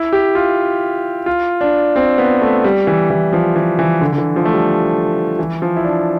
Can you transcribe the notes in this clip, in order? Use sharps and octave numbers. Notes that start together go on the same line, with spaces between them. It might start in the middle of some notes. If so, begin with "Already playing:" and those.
Already playing: E4
G4
F4
F4
D4
C4
B3
A3
G3
E3
E3
F3
E3
E3
D3
D3
E3
F3
A3
G3
E3
F3
E4
D4